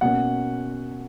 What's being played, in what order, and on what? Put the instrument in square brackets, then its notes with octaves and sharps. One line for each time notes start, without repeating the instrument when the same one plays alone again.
[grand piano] B2 A#3 C#4 F#5